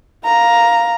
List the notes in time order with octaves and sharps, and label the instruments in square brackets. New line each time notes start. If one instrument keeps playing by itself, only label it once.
[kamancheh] F5 A#5